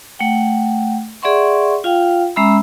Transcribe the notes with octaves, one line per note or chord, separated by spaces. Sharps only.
A3 F#5 G5
G#4 D5 E5 F#5 C6 C#6
F4 F5 G5
G#3 C#4 E5 A#5 B5 E6